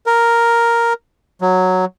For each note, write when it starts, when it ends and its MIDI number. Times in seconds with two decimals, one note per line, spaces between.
0.06 0.93 70
1.41 1.85 54